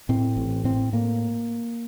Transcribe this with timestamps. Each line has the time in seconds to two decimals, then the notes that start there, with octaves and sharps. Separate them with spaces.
0.09 A2 C4
0.37 A1
0.64 A2 C4
0.93 A2 A#3